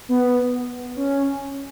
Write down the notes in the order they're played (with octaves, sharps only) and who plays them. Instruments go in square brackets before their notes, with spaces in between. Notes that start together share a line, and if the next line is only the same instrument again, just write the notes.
[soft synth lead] B3
C#4